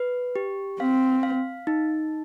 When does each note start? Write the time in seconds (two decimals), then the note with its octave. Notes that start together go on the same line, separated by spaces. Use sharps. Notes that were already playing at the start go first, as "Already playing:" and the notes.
Already playing: B4
0.36 G4
0.80 C4 F5
1.23 F5
1.67 D#4